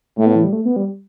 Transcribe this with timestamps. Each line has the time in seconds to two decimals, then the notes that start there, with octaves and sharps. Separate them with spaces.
0.18 A2 A3
0.26 B3
0.35 E3
0.44 G3
0.53 A3
0.65 B3
0.76 G3